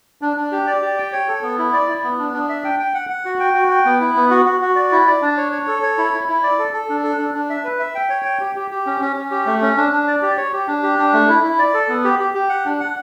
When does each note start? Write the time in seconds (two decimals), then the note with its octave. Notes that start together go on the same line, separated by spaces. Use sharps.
0.22 D4
0.37 D4
0.52 G4
0.67 D5
0.82 G4
0.97 G5
1.12 C#5
1.28 A4
1.43 B3
1.58 E4
1.73 D5
1.88 E4
2.04 B3
2.19 D4
2.34 D4
2.49 E5
2.64 G5
2.80 G5
2.94 F#5
3.10 F#5
3.25 F#4
3.40 G5
3.55 F#4
3.70 G5
3.85 B3
4.01 E4
4.16 B3
4.31 F#4
4.46 F#4
4.61 F#4
4.76 D5
4.92 E4
5.07 D5
5.22 D4
5.37 C#5
5.52 C#5
5.67 A4
5.83 C#5
5.98 E4
6.13 E4
6.28 E4
6.43 D5
6.59 A4
6.73 A4
6.89 D4
7.03 A4
7.19 D4
7.34 D4
7.50 E5
7.64 B4
7.79 E5
7.95 G5
8.10 C#5
8.25 G5
8.40 G4
8.56 G4
8.71 G4
8.86 C#4
9.01 C#4
9.16 C#4
9.31 G4
9.46 A3
9.62 C#4
9.77 D4
9.92 D4
10.07 D5
10.22 G4
10.37 C#5
10.53 G4
10.68 D4
10.83 G4
10.98 D4
11.13 A3
11.28 E4
11.44 E4
11.59 D5
11.74 A4
11.89 B3
12.04 G4
12.19 G4
12.35 G4
12.49 F#5
12.65 D4
12.80 F#5